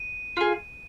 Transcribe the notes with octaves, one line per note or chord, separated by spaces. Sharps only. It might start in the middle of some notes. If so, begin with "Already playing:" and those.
Already playing: D#7
F4 G#4